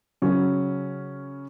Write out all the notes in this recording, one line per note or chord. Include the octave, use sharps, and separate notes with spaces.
C#3 F#3 C#4